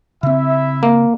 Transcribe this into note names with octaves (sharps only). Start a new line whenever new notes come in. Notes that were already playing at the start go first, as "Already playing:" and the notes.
C#3 C4 E4 E5
A#3